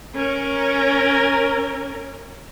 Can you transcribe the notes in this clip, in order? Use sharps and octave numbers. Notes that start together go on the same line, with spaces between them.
C#4 A#4